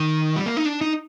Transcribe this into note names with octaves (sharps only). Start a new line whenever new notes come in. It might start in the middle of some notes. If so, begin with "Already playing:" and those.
Already playing: D#3
G3
A#3
D#4
D4
D#4